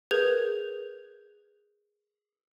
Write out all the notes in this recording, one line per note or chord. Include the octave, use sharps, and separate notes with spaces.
G#4 A#4 B4 G6 G#6 F7